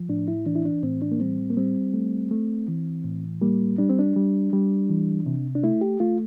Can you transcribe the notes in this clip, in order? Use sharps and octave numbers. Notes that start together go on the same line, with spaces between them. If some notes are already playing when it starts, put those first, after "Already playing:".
Already playing: F3
A2 D4
E4
E3 D4
E4
D4
A2 C4
D4
A#3
G3 C4
A#3
G3 C4
A3
A3
E3
A2
G3 A#3
G3 D4
C4
D4
G3
G3
E3
C3
D4
A3 E4
G4
A3 F4